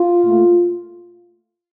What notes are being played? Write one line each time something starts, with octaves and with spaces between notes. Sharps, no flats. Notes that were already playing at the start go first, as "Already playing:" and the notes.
Already playing: F4
A#2 A3